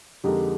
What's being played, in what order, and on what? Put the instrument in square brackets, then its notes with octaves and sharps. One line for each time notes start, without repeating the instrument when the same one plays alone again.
[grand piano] F2 D3 G#3 D#4 A#4 [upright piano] G4